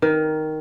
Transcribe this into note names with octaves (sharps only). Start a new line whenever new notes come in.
D#3